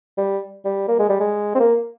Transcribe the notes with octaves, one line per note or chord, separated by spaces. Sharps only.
G3
G3
A#3
G#3
G3
G#3
C4
A#3